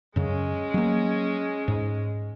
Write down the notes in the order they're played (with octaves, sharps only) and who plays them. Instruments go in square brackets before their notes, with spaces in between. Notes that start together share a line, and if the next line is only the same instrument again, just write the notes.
[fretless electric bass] F#2 C#3 [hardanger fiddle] G#3 C#4
[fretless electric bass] F#3 A#3
G#2